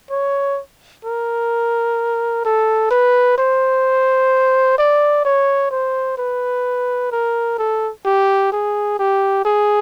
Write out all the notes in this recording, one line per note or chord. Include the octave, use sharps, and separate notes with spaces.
C#5
A#4
A4
B4
C5
D5
C#5
C5
B4
A#4
A4
G4
G#4
G4
G#4